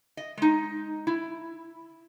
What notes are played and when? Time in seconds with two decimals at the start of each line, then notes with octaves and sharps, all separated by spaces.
0.17 D#5
0.37 G#3 D#4
1.07 E4